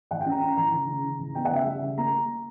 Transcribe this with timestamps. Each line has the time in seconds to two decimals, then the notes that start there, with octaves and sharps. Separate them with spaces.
0.11 E3 F#5
0.21 G5
0.26 C#4 A#5
0.42 C#4 A#5
0.57 E3 A#5
0.73 C#3
0.88 C#3
1.04 C#3
1.19 E3
1.35 B3 G5
1.45 F#5
1.51 C#3 E5
1.66 G3
1.82 C#3
1.97 A#3 A#5